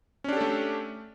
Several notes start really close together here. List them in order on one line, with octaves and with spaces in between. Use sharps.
C#4 D4 G4 A4 A3